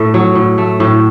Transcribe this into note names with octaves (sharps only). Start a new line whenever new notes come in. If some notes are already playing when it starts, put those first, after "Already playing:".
Already playing: A2 A3
F#3
A2
A3
A2